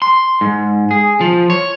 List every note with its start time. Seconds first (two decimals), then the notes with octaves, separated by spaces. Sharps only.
0.02 C6
0.41 G#2
0.91 G#4
1.21 F3
1.50 C#5